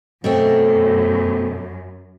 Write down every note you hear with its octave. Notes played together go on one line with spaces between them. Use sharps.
F#2 B2 A3 C4